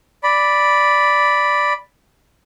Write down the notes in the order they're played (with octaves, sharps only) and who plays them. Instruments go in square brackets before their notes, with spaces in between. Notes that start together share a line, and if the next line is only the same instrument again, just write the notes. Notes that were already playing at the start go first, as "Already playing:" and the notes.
[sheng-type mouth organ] D5 B5